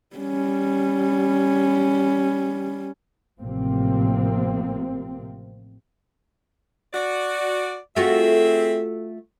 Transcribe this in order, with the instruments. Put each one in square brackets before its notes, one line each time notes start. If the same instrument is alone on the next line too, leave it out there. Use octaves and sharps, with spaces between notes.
[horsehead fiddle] G3 C#4
[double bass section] A1 A2 C3 F3 A#3 C4
[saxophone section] F#4 D5
[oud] A3 F4 F#4 [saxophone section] C4 G#4 E5